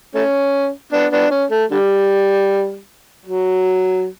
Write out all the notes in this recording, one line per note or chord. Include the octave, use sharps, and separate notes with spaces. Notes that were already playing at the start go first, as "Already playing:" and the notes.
A3 C#4
B3 D4
B3 D4
C#4
A3
D3 G3
F#3